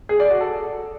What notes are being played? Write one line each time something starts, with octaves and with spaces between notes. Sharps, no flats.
G#4
D5
F#4
A4